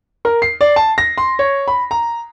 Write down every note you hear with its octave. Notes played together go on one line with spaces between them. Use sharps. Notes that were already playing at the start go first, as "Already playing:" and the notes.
A#4
C7
D5
A5
A#6
C6
C#5
B5
A#5